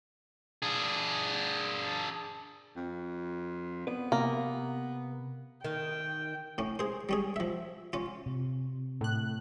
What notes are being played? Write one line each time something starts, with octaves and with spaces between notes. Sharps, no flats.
D4 G#4
F2
B3 B4 D5
C3 A#3
D#3 G5
A2 C#4
G#4 C5
G3 C#4 G#4
F3 E5
C#4 F4
C3
A2 F#6